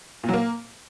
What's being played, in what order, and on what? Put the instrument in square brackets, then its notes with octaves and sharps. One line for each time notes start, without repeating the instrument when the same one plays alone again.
[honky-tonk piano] A#2
F#3
A#3